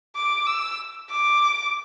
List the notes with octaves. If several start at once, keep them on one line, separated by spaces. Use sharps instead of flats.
D6
E6
D6